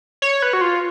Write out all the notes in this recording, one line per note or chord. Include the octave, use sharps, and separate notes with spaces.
C#5
B4
F#4
F4